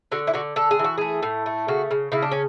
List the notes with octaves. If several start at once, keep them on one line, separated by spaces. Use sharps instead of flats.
D3 F#4
E4
D3 F#4
D3 A4
G#4
E3
F#4
A3 G#4
A2
A3
C#3 F#4
C#3
C#3 E4
D4
C#4